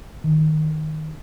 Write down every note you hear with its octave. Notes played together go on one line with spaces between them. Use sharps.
D#3